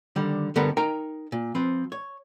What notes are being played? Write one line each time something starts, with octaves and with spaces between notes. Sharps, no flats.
D3 D#3 G3
D3 G3 B3 A4 A#4
D#4 A#4 G5 A#5
A#2
F3 C4 B4
C#5